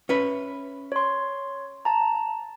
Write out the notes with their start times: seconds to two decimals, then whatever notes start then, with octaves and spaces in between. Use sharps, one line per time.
0.09 C#4 B4 E5
0.92 C#5 C6
1.85 A5 A#5